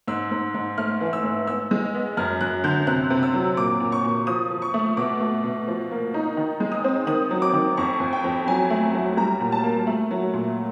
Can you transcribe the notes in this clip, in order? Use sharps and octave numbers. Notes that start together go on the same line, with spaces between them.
G#2 E6
G#2
G#2
A3 F6
E3
E6
G#2
B3 E6
G#3
B3
F#2 F6
F#2 F#6
D3 G6
C3 F#6
C3
E6
F#3
A#2 D6
A#2
C#6
A#2
F3 D#6
F3
C#6
A3
B2 D6
A3
B2
F3
A#3
D#4
D#3
G#3
D#6
C4
D#3 D#6
F#3
D6
D#3
F2 C#6
F2
G5
F2
F#3 G#5
A3
F#3
G3 A#5
A#2
A5
A#3
A3
F#3
A#2